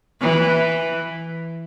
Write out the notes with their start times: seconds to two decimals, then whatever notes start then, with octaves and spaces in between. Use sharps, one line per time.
0.21 E3